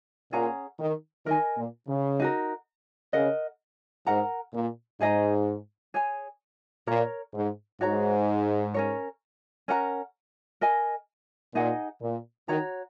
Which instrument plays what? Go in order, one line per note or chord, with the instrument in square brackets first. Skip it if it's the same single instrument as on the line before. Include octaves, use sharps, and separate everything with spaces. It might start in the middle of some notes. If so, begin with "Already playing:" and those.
[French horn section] A#2 [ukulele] C#4 G#4 F#5 A#5
[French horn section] D#3
[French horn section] D#3 [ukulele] A#4 D#5 G#5
[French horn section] A#2
C#3
[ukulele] D#4 F#4 A#4
[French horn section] C#3 [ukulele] A#4 D#5 F#5
[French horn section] G#2 [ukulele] A#4 F#5 A#5
[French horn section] A#2
[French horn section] G#2 [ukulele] D#4 G#4 D#5 A#5
[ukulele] G#4 C#5 G#5
[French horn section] A#2 [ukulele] A#4 C#5 A#5
[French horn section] G#2
[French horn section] G#2 [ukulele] F#4 C#5 A#5
[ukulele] C#4 A#4 C#5
C#4 A#4 F#5 A#5
A#4 D#5 G#5
[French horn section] A#2 [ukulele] D#4 G#4 D#5 F#5
[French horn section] A#2
[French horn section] D#3 [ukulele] F#4 C#5 A#5